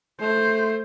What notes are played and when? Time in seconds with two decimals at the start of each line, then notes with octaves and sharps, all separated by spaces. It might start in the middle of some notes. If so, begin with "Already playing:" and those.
0.21 A3 C5